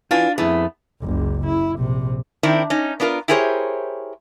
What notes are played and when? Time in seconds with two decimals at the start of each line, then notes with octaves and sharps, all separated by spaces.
0.11 D4 E4 F4 B4 G#5
0.38 F2 A3 B3 E4 G#4
1.01 F#1 C#2
1.46 E4
1.79 A#1 C3
2.43 D#3 C4 D4 E4
2.70 C#4 D#4
3.00 B3 D4 F4 A#4
3.28 E4 G4 G#4 A#4 C5 C#5